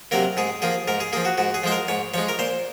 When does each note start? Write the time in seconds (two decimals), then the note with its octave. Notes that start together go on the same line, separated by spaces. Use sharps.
0.11 C3 F#3 A#3 A#4
0.37 G#2 G#4
0.62 F3 A#3 G#4
0.88 G#2 A#4
1.00 G#4
1.13 F3 A#3 G#4
1.25 F#4
1.38 G#2 F#4
1.54 G#4
1.63 F3 G#3 C5
1.72 A#4
1.88 G#2 C#5
2.14 F3 G#3 C#5
2.29 A#4
2.39 A#2 C5